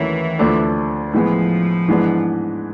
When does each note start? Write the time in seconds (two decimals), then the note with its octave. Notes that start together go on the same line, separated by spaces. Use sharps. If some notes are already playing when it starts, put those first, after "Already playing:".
Already playing: D#2 D#3 E3 F#3 A3 C#4
0.39 D2 D3 F3 A3 D4
1.13 A2 E3 F3 G#3 B3
1.88 G#2 E3 G#3 B3 D4